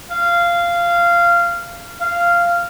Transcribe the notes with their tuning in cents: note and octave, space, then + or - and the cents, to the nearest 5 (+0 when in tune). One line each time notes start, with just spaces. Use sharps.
F5 -15
F5 -10